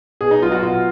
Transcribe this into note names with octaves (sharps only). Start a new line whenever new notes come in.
B2 G#4
D#4
F#3 F4
F#4
B2 F4